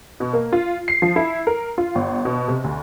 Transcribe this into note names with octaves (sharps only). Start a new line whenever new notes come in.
B2
A#3
F4
C7
F3
E4
A#4
F4
G1
B2
C3
D2